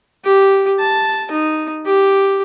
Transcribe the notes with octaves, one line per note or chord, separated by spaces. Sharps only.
G4
A5
D#4
G4